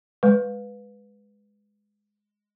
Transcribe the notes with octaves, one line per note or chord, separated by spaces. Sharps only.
G#3 B4